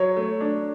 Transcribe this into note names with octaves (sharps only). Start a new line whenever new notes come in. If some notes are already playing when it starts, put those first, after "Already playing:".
Already playing: F#3 C#5
A3
D4